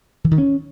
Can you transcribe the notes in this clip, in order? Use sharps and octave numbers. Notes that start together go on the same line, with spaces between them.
E3
D#3
C#4